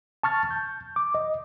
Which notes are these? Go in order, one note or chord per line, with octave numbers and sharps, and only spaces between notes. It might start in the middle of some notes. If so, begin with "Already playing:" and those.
A5 C#6 F6 A6
G6
D6
D#5